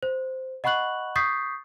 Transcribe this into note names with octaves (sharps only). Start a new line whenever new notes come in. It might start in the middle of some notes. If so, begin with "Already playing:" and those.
C5
D#5 F#5 B5 C#6 F#6 F#7
C#6 D#6 G6 A6 B6 C7